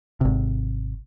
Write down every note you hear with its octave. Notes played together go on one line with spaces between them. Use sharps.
G#1 C3